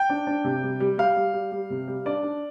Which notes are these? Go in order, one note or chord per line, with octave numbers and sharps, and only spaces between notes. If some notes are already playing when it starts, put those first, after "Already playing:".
Already playing: G5
D4
D4
C3
G3
G3
G3 F5
G3
G3
G3
C3
G3
D4 D5
D4